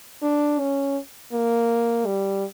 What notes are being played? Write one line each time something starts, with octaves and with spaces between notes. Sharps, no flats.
D4
C#4
A#3
G3